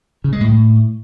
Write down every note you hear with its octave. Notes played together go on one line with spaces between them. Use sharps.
C#3
G#3
A2